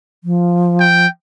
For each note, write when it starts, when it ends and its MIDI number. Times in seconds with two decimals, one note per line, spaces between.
0.24 1.07 53
0.80 1.08 79